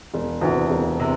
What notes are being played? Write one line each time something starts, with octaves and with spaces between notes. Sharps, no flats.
E1
D2 C3 E3
E1
C3